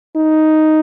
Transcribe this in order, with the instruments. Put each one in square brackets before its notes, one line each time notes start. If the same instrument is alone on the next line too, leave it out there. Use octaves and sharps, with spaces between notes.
[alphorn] D#4